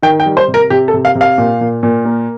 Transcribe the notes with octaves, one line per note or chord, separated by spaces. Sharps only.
D#3 G5
G5
G3
C5
C3
A#4
C3 G4
A4
C3
F5
C3
F5
A#2
A#2
A#2
A#3